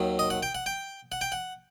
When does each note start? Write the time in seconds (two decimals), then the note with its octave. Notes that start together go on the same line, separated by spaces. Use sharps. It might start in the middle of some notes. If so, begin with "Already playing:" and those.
Already playing: D#2 D#3 F#3
0.19 D#5
0.30 F#5
0.43 G5
0.55 F#5
0.66 G5
1.12 F#5
1.21 G5
1.32 F#5